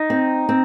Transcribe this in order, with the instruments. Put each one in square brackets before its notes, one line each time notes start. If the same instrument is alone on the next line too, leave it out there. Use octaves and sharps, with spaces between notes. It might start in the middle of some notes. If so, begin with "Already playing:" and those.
Already playing: [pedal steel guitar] D#4
[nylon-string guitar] C4
C4